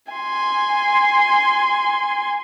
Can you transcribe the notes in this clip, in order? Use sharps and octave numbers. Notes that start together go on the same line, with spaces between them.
G#5 C6